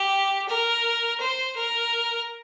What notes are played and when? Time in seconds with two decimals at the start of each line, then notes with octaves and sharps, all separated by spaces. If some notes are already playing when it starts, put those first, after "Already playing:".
Already playing: G4
0.49 A#4
1.20 C5
1.56 A#4